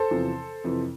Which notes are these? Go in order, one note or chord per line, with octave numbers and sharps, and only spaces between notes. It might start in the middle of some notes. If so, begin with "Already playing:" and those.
Already playing: A4 C5
E2 C3 F3
F2 C3 E3